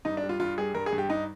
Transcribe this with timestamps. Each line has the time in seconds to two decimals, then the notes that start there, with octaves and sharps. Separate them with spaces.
0.05 G2 D#4
0.17 D4
0.23 G3
0.29 F4
0.40 G2 F4
0.58 G3 G#4
0.74 G2 A#4
0.86 G#4
0.93 G2
0.98 G4
1.09 G2 D#4